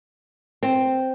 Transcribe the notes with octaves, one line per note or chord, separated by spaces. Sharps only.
C4